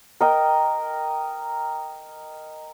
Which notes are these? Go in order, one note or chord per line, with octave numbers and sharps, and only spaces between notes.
A#4 D#5 G5